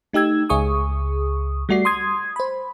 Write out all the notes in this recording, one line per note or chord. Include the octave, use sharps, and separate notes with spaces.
A3 D#4 G4 E6 G#6
C#2 G#4 C#6 D#6
G3 A3 F#4 D5 C7
C6 D#6 G#6
C5 B5